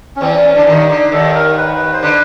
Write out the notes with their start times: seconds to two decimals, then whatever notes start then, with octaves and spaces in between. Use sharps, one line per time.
0.16 C#4
0.21 E2 E3 C4
0.32 C#4
0.45 C#4
0.55 D3 D4
0.66 D#2 D#3 D#4
0.90 D3 D#4
1.12 D#2 D#3 A4
1.35 A#4
1.58 B4
1.93 C5
2.03 D3 B4